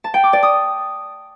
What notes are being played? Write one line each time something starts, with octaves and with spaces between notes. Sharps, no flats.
A5
G5
D6
D5
D#6